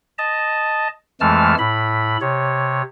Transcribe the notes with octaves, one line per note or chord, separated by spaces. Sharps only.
D#5 A5
F2 E3 G#3 A3 A5 F6
A2 B5
C3 C#5